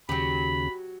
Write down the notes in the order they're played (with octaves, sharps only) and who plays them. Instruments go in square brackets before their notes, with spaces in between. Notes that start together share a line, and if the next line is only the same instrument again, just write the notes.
[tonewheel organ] D#2 C#3 [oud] F#3 G4 [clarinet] B5